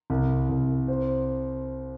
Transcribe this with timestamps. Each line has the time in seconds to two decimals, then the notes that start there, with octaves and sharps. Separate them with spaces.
0.10 C2
0.49 C2
0.88 C5